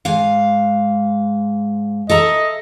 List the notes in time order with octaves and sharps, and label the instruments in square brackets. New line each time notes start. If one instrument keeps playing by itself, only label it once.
[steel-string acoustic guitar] G#2 F5
[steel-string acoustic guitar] A4 E5 A#5 [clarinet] D#5